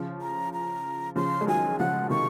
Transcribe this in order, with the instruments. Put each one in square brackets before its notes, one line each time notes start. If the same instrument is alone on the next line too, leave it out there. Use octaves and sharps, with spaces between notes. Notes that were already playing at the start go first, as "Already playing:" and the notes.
Already playing: [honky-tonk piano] C#3 F3
[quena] A#5
A#5
[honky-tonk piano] C#3 F3 [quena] C6
[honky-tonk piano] G#3
[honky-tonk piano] D#3 F#3 [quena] G#5
[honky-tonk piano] C#3 F3 [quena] F#5
[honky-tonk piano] C3 D#3 [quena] C#6